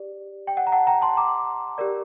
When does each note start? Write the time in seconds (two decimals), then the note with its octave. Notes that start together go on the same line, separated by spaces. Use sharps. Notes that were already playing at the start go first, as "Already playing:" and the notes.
Already playing: G4 D5
0.47 G5
0.57 F#5
0.67 A#5
0.72 F#5 A5
0.87 G5 A#5
1.02 A5 C6
1.17 A#5 D6
1.78 G4 A#4 D5